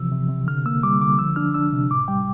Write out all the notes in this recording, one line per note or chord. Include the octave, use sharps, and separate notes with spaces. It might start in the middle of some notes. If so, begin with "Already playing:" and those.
Already playing: C3 E3 F3 E6
C3
C3
D3 F6
A#3 E6
G3 D6
D3 D6
F3 E6
D4 F6
D4 E6
C3
A2 D6
G3 G5